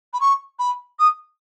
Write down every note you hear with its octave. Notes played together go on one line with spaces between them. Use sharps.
B5
C#6
B5
D#6